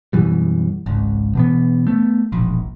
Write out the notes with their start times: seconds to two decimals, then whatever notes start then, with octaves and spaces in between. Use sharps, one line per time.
0.13 F#2 B2 E3 G3
0.86 G#1 C#2
1.35 B2 E3 B3
1.87 A3 B3
2.32 E1 A#1